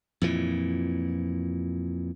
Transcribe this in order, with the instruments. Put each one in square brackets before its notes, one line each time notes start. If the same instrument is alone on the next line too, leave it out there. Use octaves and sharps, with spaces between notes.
[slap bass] F2 A#2 E3